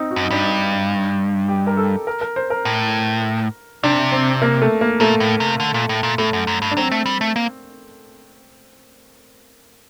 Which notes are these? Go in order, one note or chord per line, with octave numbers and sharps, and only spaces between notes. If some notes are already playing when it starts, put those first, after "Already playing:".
Already playing: C4 D#4
F#4
F#2
D#4
G2 D4
D#4
G4
A#4
A4
A#4
A#4
C5
A#4
A2
C3 D4
C4
A#3
A3
A#3
A#2 A3
A2
C3
D3
A#2
A2
A#2
A2 A3
F#2
F#2
G2
D4
F#3 C4
A3
G3
A3
A#3